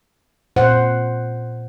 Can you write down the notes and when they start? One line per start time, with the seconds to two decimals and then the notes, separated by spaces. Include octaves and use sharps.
0.56 A#2 C5 F#5